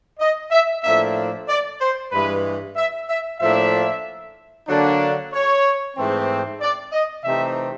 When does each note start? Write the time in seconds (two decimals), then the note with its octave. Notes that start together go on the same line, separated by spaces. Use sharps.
0.20 D#5
0.51 E5
0.84 A2 F3 A#3 D4 E5
1.48 D5
1.80 C5
2.12 G2 E3 G#3 B4
2.76 E5
3.08 E5
3.40 A2 F3 A#3 D4 E5
4.68 D3 F#3 A#3 D4
5.33 C#5
5.96 G#2 E3 A3 C4
6.61 D5
6.92 D#5
7.24 C3 E3 A3 C4 D#4 E5